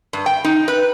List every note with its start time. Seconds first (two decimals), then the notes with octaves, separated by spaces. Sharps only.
0.13 G2
0.26 G5
0.44 D#4
0.68 B4